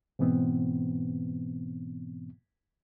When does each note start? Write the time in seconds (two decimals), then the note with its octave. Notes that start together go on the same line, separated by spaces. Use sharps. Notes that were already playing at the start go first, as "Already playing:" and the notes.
0.19 G#2 B2 E3 B3 C4